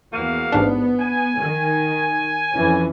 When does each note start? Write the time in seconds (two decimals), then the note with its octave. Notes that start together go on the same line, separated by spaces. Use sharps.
0.13 E2 A#3 F#4 F5
0.52 A1 G#2 B3 D4
0.99 G#5
1.36 D#3
2.54 F2 E3 C#4